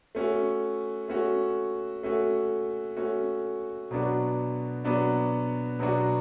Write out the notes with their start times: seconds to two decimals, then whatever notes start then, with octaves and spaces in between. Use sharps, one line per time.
0.15 A3 C#4 F#4
1.08 A3 C#4 F#4
2.03 A3 C#4 F#4
2.97 A3 C#4 F#4
3.91 B2 F#3 B3 D4 F#4
4.85 B2 F#3 B3 D4 F#4
5.79 B2 F#3 B3 D4 F#4